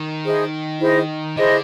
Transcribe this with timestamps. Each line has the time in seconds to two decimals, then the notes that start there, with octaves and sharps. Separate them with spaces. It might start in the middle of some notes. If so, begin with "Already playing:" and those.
Already playing: D#3
0.24 E4 G#4 C5 D#5
0.80 E4 G#4 C5 D#5
1.37 D3 E4 G#4 C5 D#5